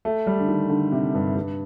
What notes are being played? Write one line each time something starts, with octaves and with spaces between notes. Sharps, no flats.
A3
G3
D3
D#3
D3
C3
G2
G2